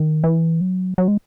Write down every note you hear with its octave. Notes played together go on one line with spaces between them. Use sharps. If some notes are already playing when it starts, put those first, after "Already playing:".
Already playing: D#3
E3
F#3
F#3
G#3